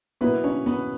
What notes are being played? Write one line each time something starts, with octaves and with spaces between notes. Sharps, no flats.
B2 F#3 A#3 B3 E4 B4
C#4 C#5
B3 B4